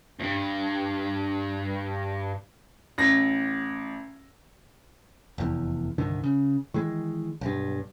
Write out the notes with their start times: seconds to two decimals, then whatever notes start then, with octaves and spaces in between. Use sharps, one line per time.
0.20 E2 G2
2.98 A1 A#6
5.38 F1 E2
5.98 C2 G2 D3 D#3
6.24 C#3
6.74 D#3 E3 G#3
7.41 B1 G2